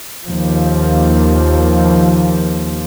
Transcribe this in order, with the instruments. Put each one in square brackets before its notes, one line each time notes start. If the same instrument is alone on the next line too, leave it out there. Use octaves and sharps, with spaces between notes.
[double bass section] D#2 F3